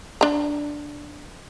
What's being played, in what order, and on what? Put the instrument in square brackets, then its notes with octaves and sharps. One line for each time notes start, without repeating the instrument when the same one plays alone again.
[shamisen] D4 A#5